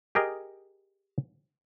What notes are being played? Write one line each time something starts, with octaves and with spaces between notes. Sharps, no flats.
G4 G#4 A#4 D#5